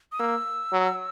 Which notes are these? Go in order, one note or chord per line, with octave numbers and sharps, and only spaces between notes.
D#6
A#3 E6
F#3